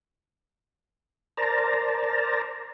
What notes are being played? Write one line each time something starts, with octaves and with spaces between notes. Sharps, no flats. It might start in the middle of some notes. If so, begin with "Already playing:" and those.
A#4 C5 D5 A5 A#5